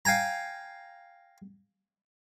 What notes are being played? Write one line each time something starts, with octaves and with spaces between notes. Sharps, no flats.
F5 G5 G#5 A#5